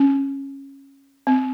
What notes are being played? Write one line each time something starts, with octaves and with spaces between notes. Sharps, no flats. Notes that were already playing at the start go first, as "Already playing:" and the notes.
Already playing: C#4
C4